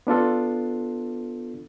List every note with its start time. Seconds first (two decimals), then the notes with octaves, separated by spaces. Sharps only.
0.07 B3 D4 F4 A4